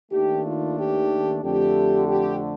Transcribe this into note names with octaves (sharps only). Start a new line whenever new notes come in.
D#2 D#3 A3 D4 G4
F4
G4
F2 D3 A3 G4
G4